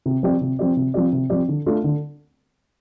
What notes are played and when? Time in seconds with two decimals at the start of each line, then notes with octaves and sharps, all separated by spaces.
0.06 C3
0.23 F3 C4 G4 D5
0.41 C3
0.59 F3 C4 G4 D5
0.77 C3
0.94 F3 C4 G4 D5
1.13 C3
1.30 F3 C4 G4 D5
1.49 D3
1.66 A3 D4 F4
1.84 D3